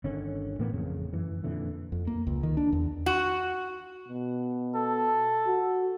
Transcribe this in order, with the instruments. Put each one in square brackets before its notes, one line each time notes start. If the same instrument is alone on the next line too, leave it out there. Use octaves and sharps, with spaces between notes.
[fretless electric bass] G1 D3 D#3 C#4
A2 E3 A#3 B3
A1 F2 C#3
F#2 E3
F2 A#2 D3 E3
[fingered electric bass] F2
A#3
C#2
D#3
D4
E2
[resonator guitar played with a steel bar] F#4
[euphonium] B2
[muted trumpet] A4
[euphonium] F#4